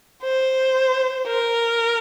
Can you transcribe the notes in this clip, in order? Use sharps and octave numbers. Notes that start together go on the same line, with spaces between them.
C5
A#4